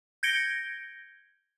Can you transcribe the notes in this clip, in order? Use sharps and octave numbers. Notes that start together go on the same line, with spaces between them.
G6 G#6 A#6 C#7 D7 G7